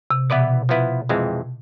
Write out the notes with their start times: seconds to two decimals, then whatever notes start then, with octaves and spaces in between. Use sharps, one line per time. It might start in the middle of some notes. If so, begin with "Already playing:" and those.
0.11 C3
0.30 B2 E3 B3 E4 B4 D5
0.69 F3 B3 E4 B4
1.09 F2 E3 G#3 C4